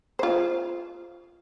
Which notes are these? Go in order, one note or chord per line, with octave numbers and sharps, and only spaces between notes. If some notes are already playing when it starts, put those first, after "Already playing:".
F4 C5